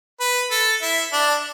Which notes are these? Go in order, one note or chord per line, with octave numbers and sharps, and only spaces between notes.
B4
A4
E4
D4